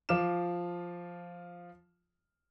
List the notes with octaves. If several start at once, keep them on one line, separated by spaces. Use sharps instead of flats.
F3 F4 D6 F6 E7